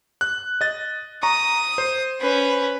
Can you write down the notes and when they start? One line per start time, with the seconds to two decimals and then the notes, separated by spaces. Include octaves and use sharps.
0.21 F#6
0.61 D#5 A6
1.23 A#5 C#6 D#6
1.78 C5
2.20 C#4 B4